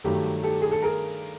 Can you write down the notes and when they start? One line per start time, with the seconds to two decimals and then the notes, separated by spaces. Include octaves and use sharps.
0.04 G2 D#3 F#3 A3 G4
0.43 G4 A4
0.62 G#4
0.72 A4
0.82 G#4 A#4